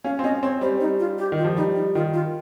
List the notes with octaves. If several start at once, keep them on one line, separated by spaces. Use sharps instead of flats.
C#4 F5
C4
C#4 D#5
C4 C#5
G3 C5
D#4
F4
G4
D#3
F4
F3
G3 D#4
D#4
D#3 F4
F4